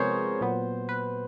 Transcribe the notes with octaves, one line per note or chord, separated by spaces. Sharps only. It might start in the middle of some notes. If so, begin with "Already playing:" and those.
Already playing: C3 F3 G#3 B3 G#4 A#4 C5 C#5
A#2 F#3 B3
B4